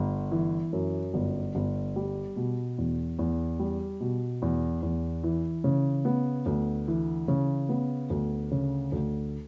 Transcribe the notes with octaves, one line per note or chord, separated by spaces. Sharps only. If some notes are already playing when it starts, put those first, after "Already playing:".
Already playing: G1
E3
F#2
G1
G1
G3
B2
E2
E2
G3
B2
E2
E2
E3
C#3
B3
D2
E3
C#3
B3
D2
C#3
D2